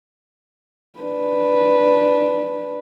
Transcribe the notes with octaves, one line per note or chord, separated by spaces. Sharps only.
D4 B4